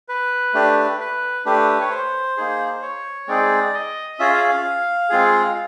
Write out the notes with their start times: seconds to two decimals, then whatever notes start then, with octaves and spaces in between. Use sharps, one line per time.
0.09 B4
0.54 A3 D4 G4
1.00 B4
1.45 A3 D4 G4 B4
1.80 C#5
1.91 C5
2.37 A#3 D#4 G#4
2.82 C#5
3.28 G#3 C4 D#4 G#4 D5
3.74 D#5
4.19 C#4 F4 G#4 E5
4.34 F5
4.49 F5
5.10 G#3 C4 F4 G#4